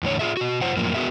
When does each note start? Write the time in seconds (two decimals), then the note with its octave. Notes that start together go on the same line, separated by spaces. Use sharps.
0.03 E2 A2 D3 C#5
0.19 F4 G#4 E5
0.37 B2 F#4
0.61 F#2 F4 C5 F#5
0.76 F#2 A2 F3 A#3
0.95 B3 F#4 G#4 A#4 E5